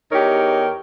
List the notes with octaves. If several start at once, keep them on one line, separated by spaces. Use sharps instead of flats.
E2 D#4 G4 A#4 C#5